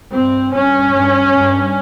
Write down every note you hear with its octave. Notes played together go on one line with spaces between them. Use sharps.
G2 C4
G2 C#4
G2
G2